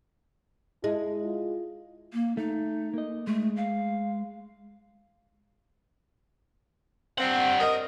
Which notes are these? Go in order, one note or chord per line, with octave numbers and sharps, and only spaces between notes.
G#3 E4
F4
A#3
A3 D#4
A#3 D#5
G#3 A3
F5
G3 C4 F#5
A#4 D#5